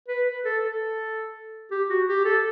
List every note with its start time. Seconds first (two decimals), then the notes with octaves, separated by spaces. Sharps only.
0.08 B4
0.27 B4
0.45 A4
0.64 A4
1.71 G4
1.90 F#4
2.08 G4
2.25 A4